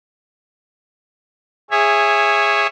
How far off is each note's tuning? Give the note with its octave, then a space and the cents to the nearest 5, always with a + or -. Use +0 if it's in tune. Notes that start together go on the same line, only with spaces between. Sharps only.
G#4 -10 C#5 +0 E5 +10